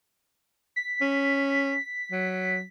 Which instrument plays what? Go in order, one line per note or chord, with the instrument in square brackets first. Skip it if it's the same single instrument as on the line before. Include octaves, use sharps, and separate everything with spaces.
[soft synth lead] B6
[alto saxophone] C#4
F#3